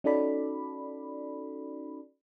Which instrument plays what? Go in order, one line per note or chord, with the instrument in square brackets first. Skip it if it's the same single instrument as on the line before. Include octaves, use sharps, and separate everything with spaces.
[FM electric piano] C#4 D#4 F#4 A4 D5 B5